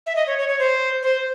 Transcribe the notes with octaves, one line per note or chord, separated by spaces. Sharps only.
E5
D#5
C#5
C#5
C#5
C5
C5